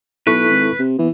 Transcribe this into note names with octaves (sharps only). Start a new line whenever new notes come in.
B1 E4 A4 B4 C#6
G#1
C3
E3 B3